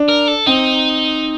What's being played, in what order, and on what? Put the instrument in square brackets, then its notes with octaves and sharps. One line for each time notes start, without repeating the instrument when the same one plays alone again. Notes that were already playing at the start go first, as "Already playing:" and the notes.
Already playing: [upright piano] D4
[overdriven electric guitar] A#4
A4
[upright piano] C4 [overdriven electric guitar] D#4